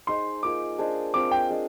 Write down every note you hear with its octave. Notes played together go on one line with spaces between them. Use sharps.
D#4 G#4 C5 C6
A#3 F4 G#4 D6
D4 G#4 C5 D#5
C4 F4 C5 F5 D6
G5
D4 G#4 C5 D#5